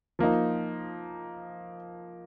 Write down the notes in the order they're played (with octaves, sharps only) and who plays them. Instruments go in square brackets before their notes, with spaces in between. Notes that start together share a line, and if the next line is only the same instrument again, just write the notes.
[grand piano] F3 A#3 D#4